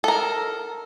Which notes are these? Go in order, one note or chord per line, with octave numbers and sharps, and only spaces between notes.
A4 A#4